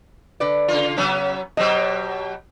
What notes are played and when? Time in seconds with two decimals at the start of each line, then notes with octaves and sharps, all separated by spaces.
0.40 D3 B4 D5
0.68 C#3 F4
0.98 C#3 F#3 B3 C#4
1.57 B2 F#3 G4 C5 D#5